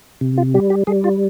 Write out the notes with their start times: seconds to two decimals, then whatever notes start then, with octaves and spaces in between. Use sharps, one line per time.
0.21 C3
0.38 F4
0.54 G3 G4
0.70 G4
0.87 G3 G#4
1.04 F4